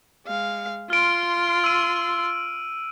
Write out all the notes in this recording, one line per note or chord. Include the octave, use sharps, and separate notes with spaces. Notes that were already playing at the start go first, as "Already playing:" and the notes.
G#3 F5
F4 C6 F6 D7
E6 D#7